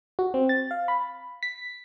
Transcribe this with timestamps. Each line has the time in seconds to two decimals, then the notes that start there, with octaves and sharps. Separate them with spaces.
0.19 F#4
0.34 C4
0.49 A6
0.71 F5
0.88 B5
1.43 B6